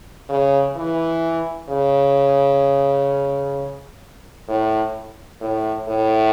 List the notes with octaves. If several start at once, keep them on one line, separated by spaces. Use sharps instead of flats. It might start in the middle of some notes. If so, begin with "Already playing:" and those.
C#3
E3
C#3
A2
A2
A2